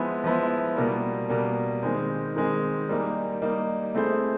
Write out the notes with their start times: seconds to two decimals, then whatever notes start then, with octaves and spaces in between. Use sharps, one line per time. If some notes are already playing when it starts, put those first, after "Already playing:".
Already playing: F3 G#3 B3 E4
0.24 F3 G#3 B3 E4
0.77 B2 G3 A#3
1.30 B2 G3 A#3
1.83 D#3 G#3 C4
2.36 D#3 G#3 C4
2.89 G3 A#3 D#4
3.42 G3 A#3 D#4
3.95 A3 C4 E4 G#4 C5